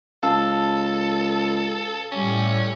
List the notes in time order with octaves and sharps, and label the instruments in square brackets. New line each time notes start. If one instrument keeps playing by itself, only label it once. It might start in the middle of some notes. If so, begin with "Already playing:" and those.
[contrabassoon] C#2 [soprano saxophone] A4 [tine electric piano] F5 A5 E6
[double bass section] A2 G3 [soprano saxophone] C#4